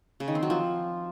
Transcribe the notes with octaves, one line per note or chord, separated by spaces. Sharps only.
C#3
D#3
C4
F#3
F3